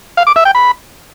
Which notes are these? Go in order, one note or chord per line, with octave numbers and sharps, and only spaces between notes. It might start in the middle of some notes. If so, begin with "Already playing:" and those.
F5
D6
E5
G5
B5